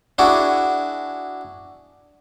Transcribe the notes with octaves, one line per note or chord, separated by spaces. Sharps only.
D4 E4 F#4 G#4